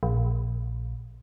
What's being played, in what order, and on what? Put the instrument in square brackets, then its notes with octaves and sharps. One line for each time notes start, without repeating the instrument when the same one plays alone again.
[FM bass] A#1